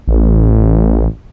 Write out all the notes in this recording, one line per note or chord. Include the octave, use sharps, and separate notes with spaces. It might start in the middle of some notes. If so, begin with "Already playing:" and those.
A1